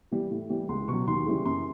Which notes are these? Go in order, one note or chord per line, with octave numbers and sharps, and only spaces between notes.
E3 G3
A2
E3 G3
C#2 C6
B2 F#3 C#6
D#2 C6
C#3 E3 G3
F#2 C6